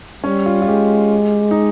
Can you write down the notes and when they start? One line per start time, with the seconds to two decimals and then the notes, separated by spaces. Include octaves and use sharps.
0.24 G3 C#4
0.46 F4
0.62 F4
0.68 G#3 G4
1.51 D#4